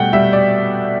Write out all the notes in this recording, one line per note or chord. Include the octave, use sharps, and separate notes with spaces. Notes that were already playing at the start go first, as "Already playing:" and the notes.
Already playing: B2 G3 A3 F#5 G5
G3 E5
D5